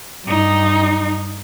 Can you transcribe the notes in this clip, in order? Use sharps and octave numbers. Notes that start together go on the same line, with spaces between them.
G2 D#4